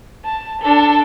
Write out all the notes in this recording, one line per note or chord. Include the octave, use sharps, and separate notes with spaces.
A5
D4 A4